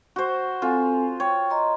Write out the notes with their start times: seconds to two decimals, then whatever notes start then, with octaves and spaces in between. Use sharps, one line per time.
0.16 F#4 C5
0.62 C4 F4 A4 G#5
1.20 C#5 G5
1.50 D#5 A#5 C6